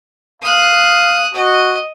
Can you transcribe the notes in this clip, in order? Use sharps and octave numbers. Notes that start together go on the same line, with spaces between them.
F5 D#6 F#6
F#4 D#5